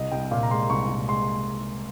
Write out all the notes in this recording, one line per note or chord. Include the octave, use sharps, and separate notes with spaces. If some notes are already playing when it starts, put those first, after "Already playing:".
Already playing: C2 D#5
C2 G5
A#2 F5
A#5
G#3 C6
C2 C#6
A#2
G#3 C6